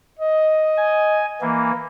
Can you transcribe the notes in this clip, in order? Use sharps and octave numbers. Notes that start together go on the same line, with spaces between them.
D#5
G#5
E3 A#3